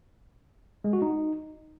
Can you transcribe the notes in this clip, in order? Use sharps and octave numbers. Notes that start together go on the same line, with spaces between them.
G#3
F#4
D#4